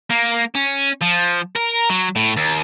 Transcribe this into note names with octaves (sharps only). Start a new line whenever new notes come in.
A#3
C#4
F3
A#4
F#3
A2
D#2